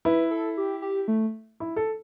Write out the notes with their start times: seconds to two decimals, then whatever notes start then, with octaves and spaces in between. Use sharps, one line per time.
0.05 E4 B4
0.31 A4
0.57 G4
0.82 G4
1.08 A3
1.60 E4
1.76 A4